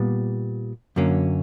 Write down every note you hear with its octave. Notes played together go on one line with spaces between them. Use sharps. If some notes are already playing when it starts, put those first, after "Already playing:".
Already playing: A#2 G3 B3
F#2 D3 F#3 A#3 C#4